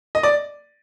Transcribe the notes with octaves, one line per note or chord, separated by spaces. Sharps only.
D#5
D5